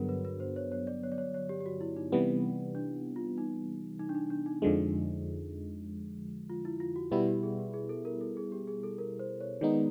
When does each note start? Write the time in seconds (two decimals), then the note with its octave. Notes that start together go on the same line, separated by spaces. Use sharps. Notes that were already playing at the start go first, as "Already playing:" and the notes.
Already playing: G2 D3 F#3 B3 G#4 A#4
0.09 B4
0.25 B4
0.40 C5
0.56 C#5
0.72 C#5
0.87 D5
1.03 C#5
1.12 D5
1.18 C#5
1.34 C#5
1.49 G4
1.61 G4
1.66 F#4
1.81 E4
1.96 D#4
2.12 C3 E3 G3 B3
2.75 D4
3.16 F4
3.38 D#4
3.99 D#4
4.09 D4
4.15 D#4
4.30 D4
4.46 D#4
4.62 F2 D3 F3 G#3 D#4
6.50 F4
6.65 E4
6.80 F4
6.96 F#4
7.11 B2 G3 B3 E4 G4
7.27 G4
7.43 G#4
7.58 G4
7.74 G#4
7.89 A4
8.05 A#4
8.21 A4
8.37 G#4
8.52 G4
8.67 G#4
8.83 A4
8.98 A#4
9.19 C5
9.40 C#5
9.61 D#3 G#3 B3 D#4 D5